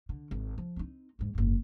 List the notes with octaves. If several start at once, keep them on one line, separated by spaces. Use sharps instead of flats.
D3
G#1
F3
C4 D#4
E2 G#2
F#1 G#2